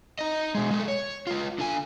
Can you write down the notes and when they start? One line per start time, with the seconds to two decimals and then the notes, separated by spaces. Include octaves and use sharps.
0.19 D#4 D#5
0.55 B2 G#3
0.71 G#3 A3
0.88 C#5
1.27 G#3 F4
1.59 D3 G#5